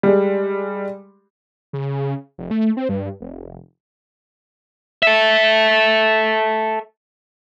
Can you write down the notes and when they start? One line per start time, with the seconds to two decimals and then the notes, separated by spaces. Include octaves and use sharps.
0.03 G3 G#3
1.73 C#3
2.38 F1
2.51 A3
2.77 C4
2.89 G2
3.21 F1
5.03 A4 E5